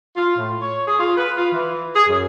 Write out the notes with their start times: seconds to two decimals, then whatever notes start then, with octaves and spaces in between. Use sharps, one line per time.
0.15 F4
0.36 A2
0.60 C#5
0.86 G#4
0.99 F4
1.16 B4
1.37 F4
1.53 E3
1.94 G#4
2.08 F#2